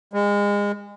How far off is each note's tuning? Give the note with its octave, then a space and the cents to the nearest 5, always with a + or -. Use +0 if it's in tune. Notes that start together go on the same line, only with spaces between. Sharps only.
G#3 -30